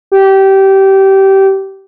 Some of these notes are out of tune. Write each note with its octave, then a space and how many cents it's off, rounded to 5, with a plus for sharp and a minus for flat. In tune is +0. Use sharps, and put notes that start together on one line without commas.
G4 -20